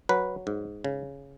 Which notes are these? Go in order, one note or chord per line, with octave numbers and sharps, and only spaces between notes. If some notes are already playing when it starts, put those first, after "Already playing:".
F#3 B4
G#2
C#3